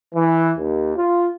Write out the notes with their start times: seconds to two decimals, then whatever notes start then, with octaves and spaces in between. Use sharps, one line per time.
0.15 E3
0.58 D#2
0.97 F4